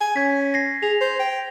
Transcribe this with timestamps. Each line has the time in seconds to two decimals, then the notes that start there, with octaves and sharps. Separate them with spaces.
0.01 G#5
0.16 C#4 G#6 B6
0.54 A#6 C7
0.83 G#4 F7
1.01 C5
1.19 G5